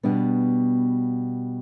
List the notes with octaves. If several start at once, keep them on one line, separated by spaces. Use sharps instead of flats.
B2 G3 B3 D4